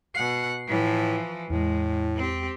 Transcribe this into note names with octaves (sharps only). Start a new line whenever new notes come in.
B2 F#5 C7
A2 E3 F3
E2 A2 G#3
C4 G4